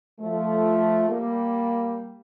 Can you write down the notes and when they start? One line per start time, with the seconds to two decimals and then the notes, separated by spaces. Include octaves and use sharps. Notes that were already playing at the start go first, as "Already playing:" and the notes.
0.20 F3 A3
1.10 G3 A#3